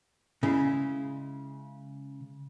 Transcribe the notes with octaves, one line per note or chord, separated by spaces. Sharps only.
C#3 G#3 E4